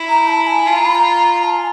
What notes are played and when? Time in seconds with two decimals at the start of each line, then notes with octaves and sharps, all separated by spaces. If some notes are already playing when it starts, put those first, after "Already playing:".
Already playing: E4
0.09 A#5
0.28 A5
0.47 G#5
0.66 F4 A5
0.76 A#5
0.86 B5
0.95 A#5
1.44 A5
1.56 G#5